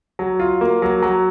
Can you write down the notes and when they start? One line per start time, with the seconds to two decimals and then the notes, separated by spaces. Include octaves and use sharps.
0.19 F#3
0.40 F4
0.61 A#3
0.82 F#3
1.02 F#3